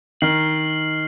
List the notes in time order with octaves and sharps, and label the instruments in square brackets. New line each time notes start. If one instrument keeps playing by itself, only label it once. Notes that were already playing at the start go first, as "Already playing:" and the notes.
[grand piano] D#3 [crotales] F6 C7 F#7